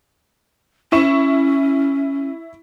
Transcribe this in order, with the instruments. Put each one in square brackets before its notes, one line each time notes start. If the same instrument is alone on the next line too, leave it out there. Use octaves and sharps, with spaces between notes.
[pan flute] C#4 [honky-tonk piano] E4 C#6 E7